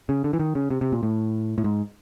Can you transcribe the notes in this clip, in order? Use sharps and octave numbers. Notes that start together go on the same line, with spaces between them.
C#3
D3
E3
D#3
C#3
C3
C3
A#2
A2
A2
G#2